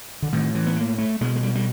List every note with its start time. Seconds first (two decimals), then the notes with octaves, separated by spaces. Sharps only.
0.22 D3
0.32 A2 D#3
0.55 E3
0.66 B3
0.76 A#3
0.98 A3
1.21 B2 G#3
1.35 G#3
1.43 G3
1.55 G3